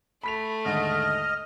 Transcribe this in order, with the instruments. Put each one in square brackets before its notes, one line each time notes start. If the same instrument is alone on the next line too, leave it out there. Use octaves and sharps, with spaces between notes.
[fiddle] A3 [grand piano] B5 B6 F7
[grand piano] D#2 G#2 D3 [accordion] D#5 [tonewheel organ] F6